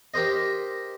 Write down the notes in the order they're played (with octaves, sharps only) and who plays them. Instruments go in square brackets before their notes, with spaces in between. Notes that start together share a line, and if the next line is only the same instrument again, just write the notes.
[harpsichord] G4 A#4 C5 D#5